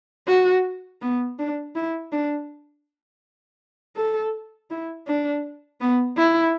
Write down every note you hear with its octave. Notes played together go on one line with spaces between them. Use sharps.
F#4
B3
D4
E4
D4
A4
E4
D4
B3
E4